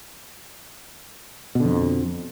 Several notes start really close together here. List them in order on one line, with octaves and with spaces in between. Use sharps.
B2 D3 F2